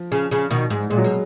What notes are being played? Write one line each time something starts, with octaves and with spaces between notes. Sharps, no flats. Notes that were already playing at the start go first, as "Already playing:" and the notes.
Already playing: F3
C#3
C#3
B2 D#3
G#2
A#2 G#3
F#3
B2 G#3